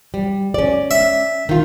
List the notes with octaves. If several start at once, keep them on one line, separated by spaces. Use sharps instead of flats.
G3
C#4 D5
E5
D#3 F4